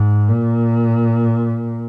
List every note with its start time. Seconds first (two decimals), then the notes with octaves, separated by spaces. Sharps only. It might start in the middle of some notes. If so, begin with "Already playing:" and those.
Already playing: G#2
0.29 A#2